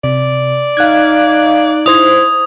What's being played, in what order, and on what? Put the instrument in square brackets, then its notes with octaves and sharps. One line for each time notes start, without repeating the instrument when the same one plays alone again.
[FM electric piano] C3 [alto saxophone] D5
[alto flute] D#4 [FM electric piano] F5 F#6 G#6
[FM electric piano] E4 C5 G#6 [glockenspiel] D#6 F7